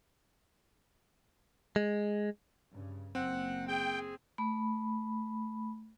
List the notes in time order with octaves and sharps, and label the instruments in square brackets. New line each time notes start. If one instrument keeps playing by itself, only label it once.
[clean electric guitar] G#3
[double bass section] G2 C#3
[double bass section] F#1 A#3 [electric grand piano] C4 [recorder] F#5
[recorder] G#4 [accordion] G5
[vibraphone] A3 B5